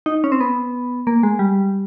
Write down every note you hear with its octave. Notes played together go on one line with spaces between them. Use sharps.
D#4
C#4
C4
B3
A#3
G#3
G3